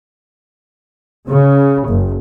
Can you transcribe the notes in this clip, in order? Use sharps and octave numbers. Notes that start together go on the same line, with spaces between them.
C#3
F#1